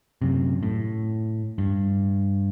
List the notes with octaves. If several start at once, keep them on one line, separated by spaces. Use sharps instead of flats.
F#2 C3
A2
G2